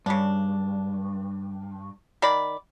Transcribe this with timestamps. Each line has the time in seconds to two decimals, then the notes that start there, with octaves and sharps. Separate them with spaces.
0.06 G2 C#3 G3 D4
2.22 D#3 D5 B5